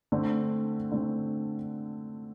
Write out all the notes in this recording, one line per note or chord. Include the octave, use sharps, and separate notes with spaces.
D3 A3 C4
D3 A3 C4